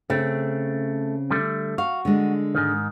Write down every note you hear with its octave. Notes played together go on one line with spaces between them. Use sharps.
C#3 A3 C4
D3 G3 A3
F#4 F5
D3 G#3
G#2 D#3